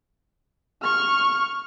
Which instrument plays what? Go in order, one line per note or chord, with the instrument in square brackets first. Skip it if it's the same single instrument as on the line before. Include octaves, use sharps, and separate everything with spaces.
[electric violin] C#6 F6